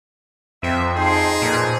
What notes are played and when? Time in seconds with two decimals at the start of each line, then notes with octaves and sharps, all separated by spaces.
0.63 F2 C4 E5
0.96 D#4 G#4 G5 A5 C6
1.42 A#2 A4 B4 C5